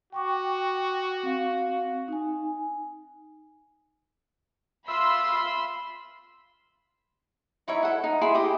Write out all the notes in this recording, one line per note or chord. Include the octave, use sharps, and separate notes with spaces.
F#4 G5 C#6 D6
C4 F5
D#4 G#5
F4 E5 B5 C6 E6
D#4 E4 C#5 E5
A4 F#5
D#4
E4 G#4 C6
G4 D#5